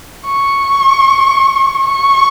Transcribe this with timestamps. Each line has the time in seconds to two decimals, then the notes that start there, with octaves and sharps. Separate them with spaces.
0.25 C#6
1.86 C#6